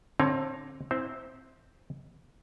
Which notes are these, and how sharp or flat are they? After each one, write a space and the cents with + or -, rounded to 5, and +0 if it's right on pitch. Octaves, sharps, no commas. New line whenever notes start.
D3 +5 C4 +30 C#5 +15
C4 +0 E4 -25 C5 +0